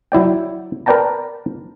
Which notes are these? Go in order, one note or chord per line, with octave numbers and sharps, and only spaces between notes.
F#3 E4 D5 G5
A#4 B4 D5 G5 A5 A#5